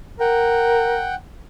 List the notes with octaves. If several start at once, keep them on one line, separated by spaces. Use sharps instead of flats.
A#4 F#5 G5